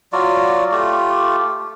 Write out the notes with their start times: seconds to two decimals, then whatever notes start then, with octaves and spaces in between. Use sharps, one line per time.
0.13 F#3 F4 F#4 D5
0.72 A3 F4 G4